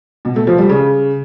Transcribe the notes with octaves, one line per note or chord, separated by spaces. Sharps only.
B2
A3
F3
G3
C#3